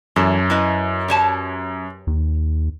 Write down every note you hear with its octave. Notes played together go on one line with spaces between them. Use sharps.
F#2 E3 A4
E4 B4 D#5
G4 C#5 A5
D#2